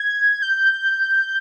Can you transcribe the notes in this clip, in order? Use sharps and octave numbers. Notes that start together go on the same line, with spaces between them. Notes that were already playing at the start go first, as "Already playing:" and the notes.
Already playing: G#6
G6